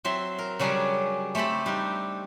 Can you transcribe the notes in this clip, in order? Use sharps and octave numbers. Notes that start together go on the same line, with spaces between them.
F#3 C4 E5 C6
A#4
C#3 F#3 G3 C#4 D4 G#4
A3 C4 G4 A4 B5
G3 D4 D#4